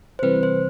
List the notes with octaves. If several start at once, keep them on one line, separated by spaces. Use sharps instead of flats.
C5
C3 E3 G3 C4 B4
C5